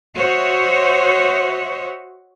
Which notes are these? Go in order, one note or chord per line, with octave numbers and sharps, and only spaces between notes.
F#4 C5 C#5 D#5 E5